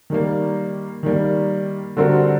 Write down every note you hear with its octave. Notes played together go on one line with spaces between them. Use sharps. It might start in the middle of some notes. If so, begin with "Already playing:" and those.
D#3 G3 A#3
D#3 G3 A#3
D3 G3 C4 F#4 A#4